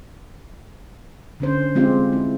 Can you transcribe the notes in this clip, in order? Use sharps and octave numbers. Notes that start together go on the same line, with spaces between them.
D3 C#4 C5
G#3 C4 F4 G4 F5
E4